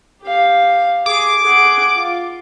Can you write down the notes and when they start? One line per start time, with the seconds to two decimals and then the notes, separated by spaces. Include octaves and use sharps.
0.23 G4 F5
1.06 G#4 D6
1.43 G#4 F#5
1.95 F4